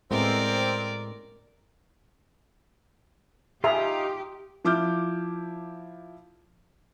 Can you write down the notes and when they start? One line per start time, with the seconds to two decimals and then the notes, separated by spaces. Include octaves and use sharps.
0.11 A2 G#3 B3 C4 A#4 D5
3.64 D#4 F4 G4 G#4 E5 A#5
4.65 F3 E4 D6 F6 G6